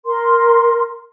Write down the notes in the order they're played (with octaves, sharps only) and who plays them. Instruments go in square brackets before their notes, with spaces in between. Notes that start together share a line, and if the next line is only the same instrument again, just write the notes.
[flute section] A#4 C6